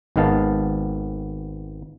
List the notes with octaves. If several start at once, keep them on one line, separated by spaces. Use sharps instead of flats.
G#1 G#2 D#3 B3 F5 A5